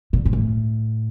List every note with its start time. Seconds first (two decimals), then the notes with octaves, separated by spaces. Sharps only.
0.13 A#2
0.25 G#2
0.33 A2